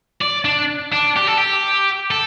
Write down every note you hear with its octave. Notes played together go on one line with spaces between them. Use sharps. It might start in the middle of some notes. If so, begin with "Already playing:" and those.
D5
D4
D4
G4
A4
G4
A4